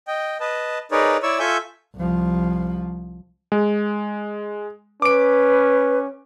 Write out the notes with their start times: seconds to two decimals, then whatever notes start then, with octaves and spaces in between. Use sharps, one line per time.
0.07 D#5 G5
0.40 B4 D#5 A5
0.91 D#4 G#4 A#4 B4 C#5 D5
1.23 E4 C#5 D5 C#6 E6
1.39 F4 A4 E5 G#5 C#6 G6
1.96 C2 F3
3.52 G#3
5.02 C#4 B4 D6 D7